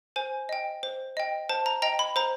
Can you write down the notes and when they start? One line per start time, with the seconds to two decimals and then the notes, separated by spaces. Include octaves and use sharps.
0.16 C5 G#5
0.49 D#5 G5
0.83 C5
1.17 D#5 G5
1.49 C5 A5
1.66 A#5
1.82 D#5 G5 A#5
1.99 B5
2.16 C5 A#5